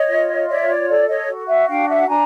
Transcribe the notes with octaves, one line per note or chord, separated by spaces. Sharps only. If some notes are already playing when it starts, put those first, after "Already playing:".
Already playing: C#5 D#5
F4
C#5 D5 E5
D5
A4 D5
C#5 D#5
F#4
E5 F#5
D4 F5 G5
E5 F#5
D4 G#5 A#5